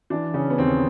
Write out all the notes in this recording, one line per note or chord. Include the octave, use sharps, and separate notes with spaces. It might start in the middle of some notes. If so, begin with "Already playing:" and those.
E3 D4
C#3 C#4
B3
D#2 C4